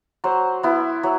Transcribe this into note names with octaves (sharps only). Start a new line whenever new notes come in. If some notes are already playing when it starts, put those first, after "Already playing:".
F#3 C5
B3 E4
F#3